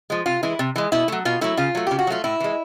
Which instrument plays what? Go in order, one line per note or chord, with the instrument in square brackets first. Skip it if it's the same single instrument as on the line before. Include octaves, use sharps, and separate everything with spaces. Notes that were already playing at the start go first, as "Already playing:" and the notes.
[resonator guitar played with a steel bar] F3 G#3
C3 F4
E3 G#3 E4
C3
E3 G#3
B2 E4
F#3 A3
B2 F4
F#3 A3 E4
C#3 F4
F#3 A3
C#3 G4
F#4
F#3 A3 F4
A2 E4
E3 G#3